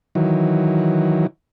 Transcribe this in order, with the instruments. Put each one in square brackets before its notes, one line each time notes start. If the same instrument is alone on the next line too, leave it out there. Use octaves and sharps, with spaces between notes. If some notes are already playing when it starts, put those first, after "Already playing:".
[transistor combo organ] D#3 E3 F#3